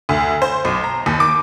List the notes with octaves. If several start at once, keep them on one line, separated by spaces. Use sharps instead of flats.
D2
C5
B1
A#5
D#2
D6